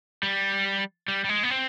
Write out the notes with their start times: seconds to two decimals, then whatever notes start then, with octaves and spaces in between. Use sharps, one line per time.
0.23 G3
1.08 G3
1.24 G3
1.29 G#3
1.43 B3
1.51 C4